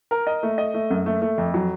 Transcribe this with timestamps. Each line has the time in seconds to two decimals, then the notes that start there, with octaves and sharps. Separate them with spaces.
0.11 A#4
0.27 D#5
0.43 A3
0.58 D#5
0.74 A3
0.91 F#2
1.06 A3
1.22 A3
1.38 F2
1.54 F#3